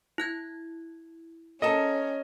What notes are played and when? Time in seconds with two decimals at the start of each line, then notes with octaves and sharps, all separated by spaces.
0.18 E4 F#6 G#6
1.62 C#4 A4 A#4 D#5 A5